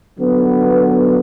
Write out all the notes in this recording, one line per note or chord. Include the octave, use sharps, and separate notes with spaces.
D3 F#3 B3